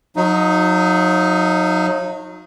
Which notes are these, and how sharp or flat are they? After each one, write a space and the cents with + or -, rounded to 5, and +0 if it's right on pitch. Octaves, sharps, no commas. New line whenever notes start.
F#3 -35 D#4 +0 F5 -45